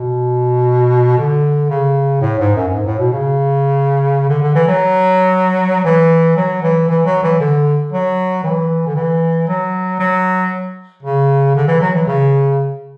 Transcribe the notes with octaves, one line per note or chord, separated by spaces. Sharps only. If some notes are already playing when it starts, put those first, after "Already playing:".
Already playing: B2
D3
C#3
A2
G#2
F#2
F#2
G#2
A2
B2
C#3
D3
D3
E3
F#3
E3
F#3
E3
E3
F#3
E3
D3
F#3
E3
D3
E3
F#3
F#3
C#3
D3
E3
F#3
E3
C#3